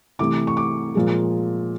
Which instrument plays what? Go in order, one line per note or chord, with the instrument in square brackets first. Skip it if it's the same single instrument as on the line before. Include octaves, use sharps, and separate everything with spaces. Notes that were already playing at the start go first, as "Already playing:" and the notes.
[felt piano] C3 E3 A3 D6
C#6
D6
A#2 F3 G#3